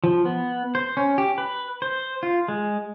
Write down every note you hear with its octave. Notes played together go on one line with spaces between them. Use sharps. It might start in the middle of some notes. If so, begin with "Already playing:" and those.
F3
B3
C5
C#4
G4
B4
C5
F4
G#3